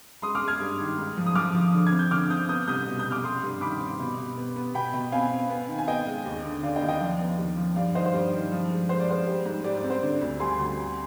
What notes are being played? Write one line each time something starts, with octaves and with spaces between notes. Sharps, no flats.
G#3 C6 D#6
D6 F6
G#3
F6 G#6
G2
D#3
G#2
F3
D#6
F3 D6 F6
F3
D3
G#6
C4
G6
D3 D6 F6
C4 D#6 G6
B3 D#6 G6
C2 D#6 G6
B2
D#6 G6
C2
D6 F6
G3 C6 D#6
G2
D#3 B5 D6
C4
B2
B2
B3
B3
B2 G5 B5
B2
C4 F5 G#5
C4
B3
D#3
G#5
B3 D#5 G5
G#3
D#2
D3
D3 D5 F5
D#5 G5
D#2
D#5 G5
F3 D5 F5
B3
D#2
F3
G2 D5 F5
D#3 C5 D#5
C5
G2 D5
D#3
F3
G#3
G#3 C5
D5
G#3 C5
G3
G#2
G3 D5
D5
C4
C5
D3 D5
D2
G3 G#5 C6
D2
G3